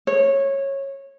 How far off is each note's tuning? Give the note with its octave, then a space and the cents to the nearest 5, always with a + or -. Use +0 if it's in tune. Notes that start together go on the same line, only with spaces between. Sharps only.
C#5 -15